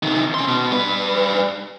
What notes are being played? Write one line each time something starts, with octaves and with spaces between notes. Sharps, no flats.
C3 D#3
C#4 C6
B2
G3 B4